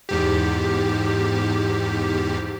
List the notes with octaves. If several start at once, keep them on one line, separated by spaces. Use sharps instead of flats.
E2 G#2 G4